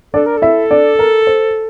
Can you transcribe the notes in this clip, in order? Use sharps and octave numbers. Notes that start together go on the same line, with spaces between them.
D4 A4 D5
A#4
A4
E4 E5
D4 D5
A#4
C5